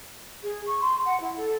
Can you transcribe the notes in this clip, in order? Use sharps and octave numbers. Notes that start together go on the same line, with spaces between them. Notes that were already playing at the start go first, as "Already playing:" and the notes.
G#4
C#6
C6
F#5
E4
A4